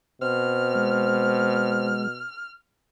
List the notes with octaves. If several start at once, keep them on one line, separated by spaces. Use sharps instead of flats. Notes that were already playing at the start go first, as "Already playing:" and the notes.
B2 C4 F6
G#3